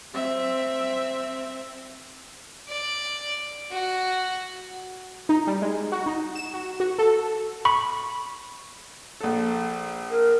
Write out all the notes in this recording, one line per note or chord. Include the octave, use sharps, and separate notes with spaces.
C4 E5
D5
F#4
D#4
G3
G#3
F#4
D#4
E7
F#4
F#4
A4
B5 C#6
A#1 A4
A#4